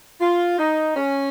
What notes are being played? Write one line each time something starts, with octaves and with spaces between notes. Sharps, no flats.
F4
D#4
C#4